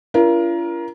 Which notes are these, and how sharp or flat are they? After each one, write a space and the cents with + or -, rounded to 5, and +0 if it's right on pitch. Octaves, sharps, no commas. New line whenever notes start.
D4 -40 F4 -45 A#4 +20